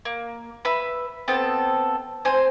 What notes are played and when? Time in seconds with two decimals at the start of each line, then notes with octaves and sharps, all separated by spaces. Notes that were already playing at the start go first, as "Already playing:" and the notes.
0.05 A#3
0.65 B4 E5 B5
1.28 B3 C4 A4
2.25 C4 C5 G#5